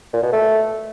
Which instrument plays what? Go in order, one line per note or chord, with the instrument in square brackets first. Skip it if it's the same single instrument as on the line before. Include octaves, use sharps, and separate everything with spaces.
[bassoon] A#2
B2
A3